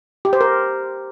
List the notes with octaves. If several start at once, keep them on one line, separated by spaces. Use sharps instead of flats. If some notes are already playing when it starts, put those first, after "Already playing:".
G4
C5
A#4